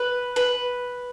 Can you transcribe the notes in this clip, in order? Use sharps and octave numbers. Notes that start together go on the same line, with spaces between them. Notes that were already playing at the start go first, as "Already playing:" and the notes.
Already playing: B4
B4